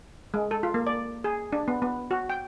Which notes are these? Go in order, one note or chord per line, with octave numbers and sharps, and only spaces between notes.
G#3
A4
F4
A#3
D5
G#4
D4
B3
B3
F#4
G5